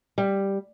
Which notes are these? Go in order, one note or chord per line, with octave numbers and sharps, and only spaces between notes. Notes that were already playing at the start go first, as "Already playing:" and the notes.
G3